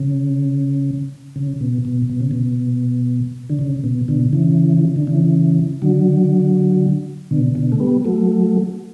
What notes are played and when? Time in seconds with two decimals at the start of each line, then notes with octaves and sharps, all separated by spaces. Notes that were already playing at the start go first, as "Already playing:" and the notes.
Already playing: C#3
1.36 C#3
1.61 B2
1.85 B2
2.10 B2
2.20 C#3
2.31 B2
3.50 D3
3.59 C#3
3.84 B2
4.08 B2 D3
4.33 C#3 E3
4.96 D3
5.07 C#3 E3
5.82 D3 F#3
7.31 B2 D3
7.55 B2 D3
7.72 A3
7.80 G3 B3
8.05 F#3 A3